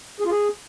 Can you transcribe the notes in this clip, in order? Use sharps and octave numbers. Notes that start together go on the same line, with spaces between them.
G#4
F4
G#4